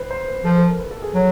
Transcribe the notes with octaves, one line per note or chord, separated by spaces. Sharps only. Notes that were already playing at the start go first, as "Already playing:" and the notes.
Already playing: B4 C5
C5
B4
F3 A4
A4
A#4
B4
A4
G#4
F#3